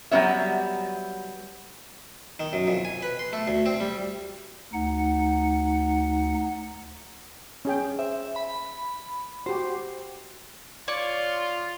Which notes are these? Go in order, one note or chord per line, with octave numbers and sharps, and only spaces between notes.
F#3 G3 B3 C#5 E5
D#3
F#2
F2
G#5
B4
C6
A3
D2
C4
G3
D2 D#4 F#5
C#4 G#4 G5
C5 E5
B5
F#4 G4 C5
F4 C#5 D5 C#6